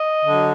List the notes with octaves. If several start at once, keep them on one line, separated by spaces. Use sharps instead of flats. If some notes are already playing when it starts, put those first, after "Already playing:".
Already playing: D#5
D3 F#3